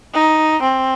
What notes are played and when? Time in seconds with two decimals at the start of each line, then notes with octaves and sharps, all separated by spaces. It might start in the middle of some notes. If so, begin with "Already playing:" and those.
0.14 D#4
0.63 C4